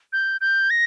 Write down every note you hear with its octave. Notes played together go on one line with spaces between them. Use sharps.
G6
G6
A#6